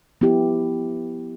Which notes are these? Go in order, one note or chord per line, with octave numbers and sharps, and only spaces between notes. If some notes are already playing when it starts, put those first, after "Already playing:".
F3 B3 E4 G4